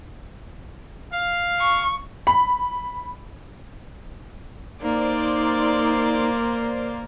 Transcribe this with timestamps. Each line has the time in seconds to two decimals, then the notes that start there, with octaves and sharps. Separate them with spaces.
1.12 F5
1.59 C#6
2.27 B5
4.83 A#3 D#4 C5 D5 C6